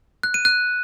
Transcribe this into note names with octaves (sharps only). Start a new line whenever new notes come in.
F#6
D#7
F#6